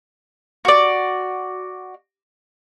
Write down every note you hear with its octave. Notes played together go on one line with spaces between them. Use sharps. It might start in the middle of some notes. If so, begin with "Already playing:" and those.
F#4 D5